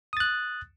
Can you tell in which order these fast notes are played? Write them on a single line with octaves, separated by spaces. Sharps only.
D#6 A6 F#6